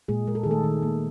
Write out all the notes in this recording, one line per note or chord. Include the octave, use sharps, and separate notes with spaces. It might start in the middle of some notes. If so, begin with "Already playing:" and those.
A#2 G#3 G#4
G#3 A#4
A4
D#3 G#4
A3 A4
D#3
A#3